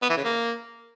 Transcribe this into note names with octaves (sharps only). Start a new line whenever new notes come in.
B3
E3
C#3
A#3